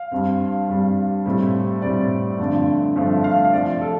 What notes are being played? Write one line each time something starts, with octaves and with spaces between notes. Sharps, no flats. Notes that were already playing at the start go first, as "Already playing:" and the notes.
Already playing: F5
G2 G3 C4
G2 G3 C4
A2 G3 C4
A2 G3 C4 D5
G2 D3 F3 A3 C4
G2 D3 F3 A3 C4
F5
F5
C3 F3 C4 D5
A4